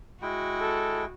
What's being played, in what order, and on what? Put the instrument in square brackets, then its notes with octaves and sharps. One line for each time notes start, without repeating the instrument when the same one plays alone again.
[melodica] G#3 E4 G5 [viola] F#4
[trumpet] A4